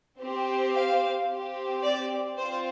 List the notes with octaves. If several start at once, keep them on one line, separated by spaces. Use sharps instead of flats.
C4 G4
F5
C4 G4
D5
C4 F4 C5